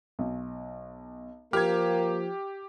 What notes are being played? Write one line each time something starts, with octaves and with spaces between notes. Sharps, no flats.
B1
F3 A#3 G4 F6 G#6